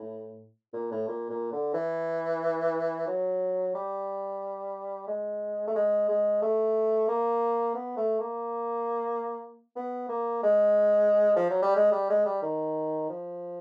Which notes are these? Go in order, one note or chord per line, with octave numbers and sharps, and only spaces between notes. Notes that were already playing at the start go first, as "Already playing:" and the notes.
Already playing: A2
A#2
A2
A#2
A#2
D3
E3
F#3
G3
G#3
A3
G#3
G#3
A3
A#3
B3
A3
A#3
B3
A#3
G#3
F3
F#3
G3
G#3
G3
G#3
G3
D#3
F3